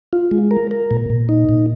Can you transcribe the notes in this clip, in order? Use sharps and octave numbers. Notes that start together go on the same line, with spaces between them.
F4
G#3
A#4
A#4
A#2
A#2
D#4
A#2